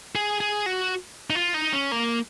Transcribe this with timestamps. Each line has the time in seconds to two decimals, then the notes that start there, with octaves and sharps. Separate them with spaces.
0.15 G#4
0.41 G#4
0.66 F#4
1.30 D#4
1.35 F4
1.54 D#4
1.73 C#4
1.92 A#3